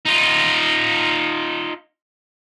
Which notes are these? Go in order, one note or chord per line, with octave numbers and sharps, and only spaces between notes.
D#4 F4